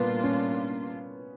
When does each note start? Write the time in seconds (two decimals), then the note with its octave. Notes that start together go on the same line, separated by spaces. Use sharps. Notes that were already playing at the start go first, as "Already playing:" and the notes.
Already playing: A#2 G3 A#3 B3 D4 F4
0.23 C#4